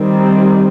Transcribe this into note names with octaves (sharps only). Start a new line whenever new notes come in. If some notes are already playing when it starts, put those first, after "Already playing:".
Already playing: D#3 G3 C4